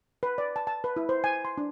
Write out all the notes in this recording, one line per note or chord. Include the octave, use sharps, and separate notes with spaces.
B4
D5
A5
A5
B4
E4
C5
G#5
C6
D4